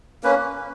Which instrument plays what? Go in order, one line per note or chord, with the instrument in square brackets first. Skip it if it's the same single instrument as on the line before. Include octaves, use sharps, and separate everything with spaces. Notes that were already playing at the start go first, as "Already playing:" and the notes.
[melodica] A#3 C#4 B4